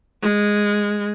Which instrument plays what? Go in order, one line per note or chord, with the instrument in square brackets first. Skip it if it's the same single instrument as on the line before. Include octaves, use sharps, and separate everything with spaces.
[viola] G#3